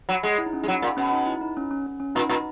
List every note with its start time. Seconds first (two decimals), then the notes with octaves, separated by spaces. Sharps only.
0.09 F#3
0.23 G#3
0.38 E4
0.46 D#4
0.53 C#4
0.61 G#3 D#4
0.68 F#3
0.82 A#2
0.97 B2 C#4
1.12 D#4
1.26 E4
1.41 D#4
1.57 C#4
1.71 C#4
1.86 C#4
2.00 C#4
2.15 A#2 D#4
2.29 A#2